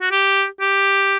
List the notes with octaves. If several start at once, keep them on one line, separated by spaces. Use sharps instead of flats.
F#4
G4
G4